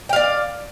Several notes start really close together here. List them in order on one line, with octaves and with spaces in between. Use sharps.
G5 F5 D5